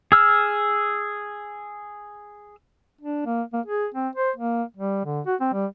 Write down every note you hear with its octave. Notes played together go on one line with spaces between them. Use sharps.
G#4 E6 F6
D4
A#3
A#3
G#4
C4
C5
A#3
G3
D3
F#4
C4
G3